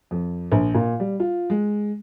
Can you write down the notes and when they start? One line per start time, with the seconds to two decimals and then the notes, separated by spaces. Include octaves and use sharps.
0.11 F2
0.52 A#1
0.74 A#2
1.00 G3
1.20 F4
1.50 G#3